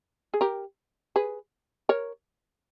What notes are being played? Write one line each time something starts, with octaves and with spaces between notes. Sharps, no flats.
G#4
G4 A#4
G#4 B4
A#4 C#5